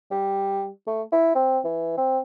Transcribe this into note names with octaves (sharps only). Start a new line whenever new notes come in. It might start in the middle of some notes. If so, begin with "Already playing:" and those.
G3
A3
E4
C4
E3
C4